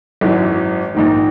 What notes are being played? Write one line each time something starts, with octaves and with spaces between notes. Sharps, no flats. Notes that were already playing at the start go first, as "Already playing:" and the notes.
G#1 F#2 E3
A#1 G#2 D#3